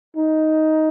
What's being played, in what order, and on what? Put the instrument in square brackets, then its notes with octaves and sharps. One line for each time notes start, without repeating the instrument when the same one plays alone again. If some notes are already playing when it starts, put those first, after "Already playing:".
[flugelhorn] D#4